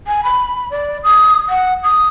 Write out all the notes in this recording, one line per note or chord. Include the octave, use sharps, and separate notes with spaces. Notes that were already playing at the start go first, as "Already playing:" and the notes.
G#5
B5
D5
D#6
F#5
D#6